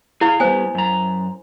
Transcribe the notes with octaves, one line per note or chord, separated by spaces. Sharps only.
E4 G#4 F5
G3 B3 C5 G#5
F#2 A#5